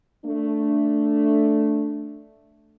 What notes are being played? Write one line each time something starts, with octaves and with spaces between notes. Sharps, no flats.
A3 D4